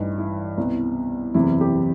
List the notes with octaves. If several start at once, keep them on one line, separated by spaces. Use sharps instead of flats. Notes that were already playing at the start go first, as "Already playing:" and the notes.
Already playing: A1 G2 E3 D#4
E4
C2 B2
F#1 E2 C3 E3 E4
G4